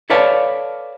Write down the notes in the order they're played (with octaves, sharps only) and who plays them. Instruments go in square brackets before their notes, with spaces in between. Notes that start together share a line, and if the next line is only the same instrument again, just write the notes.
[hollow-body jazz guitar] A4 B4 C#5 D5 F5 A5